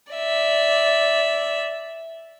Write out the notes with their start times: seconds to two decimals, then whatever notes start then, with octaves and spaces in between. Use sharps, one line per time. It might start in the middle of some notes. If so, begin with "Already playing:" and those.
0.13 D5 E5